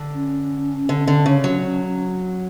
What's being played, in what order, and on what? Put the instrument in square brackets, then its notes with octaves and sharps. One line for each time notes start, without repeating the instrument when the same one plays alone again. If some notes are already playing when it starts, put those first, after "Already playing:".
Already playing: [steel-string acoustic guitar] D3
[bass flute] C#4
[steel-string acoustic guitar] D3
D3
C#3
F#3